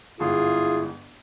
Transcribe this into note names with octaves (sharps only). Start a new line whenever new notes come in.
G1 G#2 E4 F4 G#4